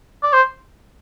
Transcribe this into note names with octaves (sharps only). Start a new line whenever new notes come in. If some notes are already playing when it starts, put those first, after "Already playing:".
D5
C5